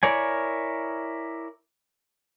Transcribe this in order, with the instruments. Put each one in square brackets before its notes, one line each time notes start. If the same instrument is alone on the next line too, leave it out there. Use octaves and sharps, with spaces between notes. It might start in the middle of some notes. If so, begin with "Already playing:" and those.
[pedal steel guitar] E4 A#4 C#5 D5 G#5